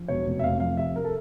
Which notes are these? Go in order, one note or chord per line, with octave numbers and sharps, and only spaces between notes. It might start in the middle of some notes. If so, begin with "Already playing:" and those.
Already playing: F3
E1 C#5
F1
E5
F1 F5
F2 F5
C3 E5
A#4
A4